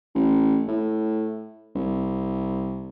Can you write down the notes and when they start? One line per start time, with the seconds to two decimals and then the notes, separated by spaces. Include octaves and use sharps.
0.15 A1
0.68 A2
1.75 C2